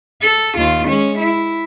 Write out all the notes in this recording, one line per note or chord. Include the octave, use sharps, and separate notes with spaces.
A4
D#2 F4
G#3 C#4
E4